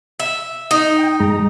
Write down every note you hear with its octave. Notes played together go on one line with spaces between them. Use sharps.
E5
D#4
G5
G2 G#3 A#5